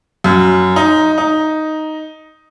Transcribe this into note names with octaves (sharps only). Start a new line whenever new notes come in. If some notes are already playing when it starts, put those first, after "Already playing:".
F#2
D#4
D#4